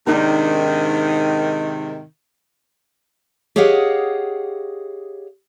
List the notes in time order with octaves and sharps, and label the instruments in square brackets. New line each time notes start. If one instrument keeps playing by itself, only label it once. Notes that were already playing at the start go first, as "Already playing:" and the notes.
[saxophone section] G#2 C3 D#3 [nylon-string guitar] D4 D#4 A#4
[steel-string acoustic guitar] G4 G#4 C#5 D#5 F5 F#5